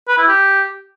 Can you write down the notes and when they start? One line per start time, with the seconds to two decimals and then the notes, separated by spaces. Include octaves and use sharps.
0.08 B4
0.18 E4
0.28 G4